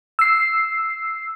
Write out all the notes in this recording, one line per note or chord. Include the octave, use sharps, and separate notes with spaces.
E6 C7